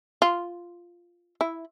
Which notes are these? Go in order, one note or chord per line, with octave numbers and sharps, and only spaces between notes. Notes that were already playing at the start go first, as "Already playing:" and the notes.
F4
E4